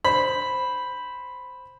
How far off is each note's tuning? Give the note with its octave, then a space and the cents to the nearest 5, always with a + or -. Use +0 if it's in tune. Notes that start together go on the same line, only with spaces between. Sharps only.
C5 +5 B5 +0